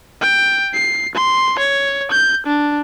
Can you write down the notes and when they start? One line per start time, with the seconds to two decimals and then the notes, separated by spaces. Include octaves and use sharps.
0.21 G5
0.74 C7
1.15 C6
1.59 C#5
2.11 G6
2.46 D4